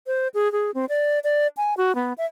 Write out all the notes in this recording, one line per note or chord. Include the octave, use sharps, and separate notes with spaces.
C5
G#4
G#4
C4
D5
D5
G#5
F#4
B3
E5